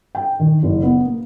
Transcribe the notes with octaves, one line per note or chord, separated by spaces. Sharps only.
G5
D#3
F#1
B3
A#3